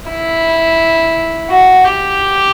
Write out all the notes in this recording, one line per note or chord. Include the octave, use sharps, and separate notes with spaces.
E4
F#4
G4